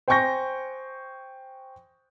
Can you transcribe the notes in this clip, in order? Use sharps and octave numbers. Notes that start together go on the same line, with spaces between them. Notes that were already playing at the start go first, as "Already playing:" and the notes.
C5 G5 G#5 C#6 G6 A#6